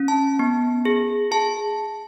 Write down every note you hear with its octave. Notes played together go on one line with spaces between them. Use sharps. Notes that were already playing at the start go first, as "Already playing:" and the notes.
Already playing: C#4
A5
B3
G#4
G#4 A5